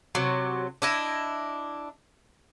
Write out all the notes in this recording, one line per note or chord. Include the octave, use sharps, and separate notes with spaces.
C3 F#3
D4 E4 D#5